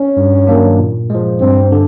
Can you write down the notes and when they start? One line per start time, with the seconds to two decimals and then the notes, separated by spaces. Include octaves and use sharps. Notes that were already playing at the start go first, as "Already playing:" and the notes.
Already playing: C#4
0.17 G2
0.47 D#3 F#3 A#3 D4
0.79 A#2
1.10 F3 G#3
1.40 G2 C4
1.72 D3